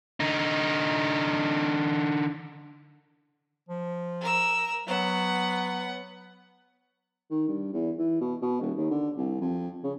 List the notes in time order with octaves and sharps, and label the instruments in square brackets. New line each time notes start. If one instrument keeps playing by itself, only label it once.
[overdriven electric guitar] D3 D#4
[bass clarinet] F3
[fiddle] A#4 E6
[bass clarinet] F#3 [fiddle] B3 F#5
[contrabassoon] D#3
G2
E2
E3
B2
B2
D#1
D#2
D3
C2
F2
C#3